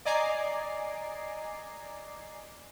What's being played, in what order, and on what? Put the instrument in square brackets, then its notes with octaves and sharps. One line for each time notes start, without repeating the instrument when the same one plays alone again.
[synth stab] D5 D#5 G#5 A#5 D6 C7